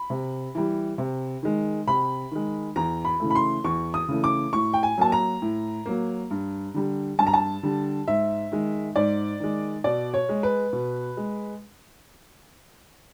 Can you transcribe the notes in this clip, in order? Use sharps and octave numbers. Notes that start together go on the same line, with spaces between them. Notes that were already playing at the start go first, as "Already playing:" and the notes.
Already playing: B5
C3
E3 G3
C3
D#3 G#3
C3 B5
D#3 G#3
E2 A#5
B5
C#3 E3 A3
B5
C6
E2 C#6
D#6
C#3 E3 A3
D6
A2 C#6
G5
G#5
F#3 A#3 A5
A#5
A2
F#3 A#3
G2
D3 G3
G2 A5
A#5
A5
D3 G3
G#2 E5
D#3 G#3
G#2 D5
D#3 G#3
B2 D5
C#5
G#3
B4
B2
G#3